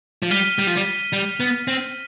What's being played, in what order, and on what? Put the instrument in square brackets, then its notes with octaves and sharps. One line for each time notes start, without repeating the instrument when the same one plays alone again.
[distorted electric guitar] F3
[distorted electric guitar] G3 [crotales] F6 B6 D#7 G7
[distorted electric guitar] G3
F3
G3
G3
B3
C4